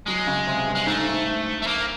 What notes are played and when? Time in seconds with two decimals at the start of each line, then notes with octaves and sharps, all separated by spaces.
0.07 F#3 G#3
0.27 C#3
0.47 C3
0.66 G2
0.75 G#3
0.87 G#2 A3
1.62 A3
1.67 A#3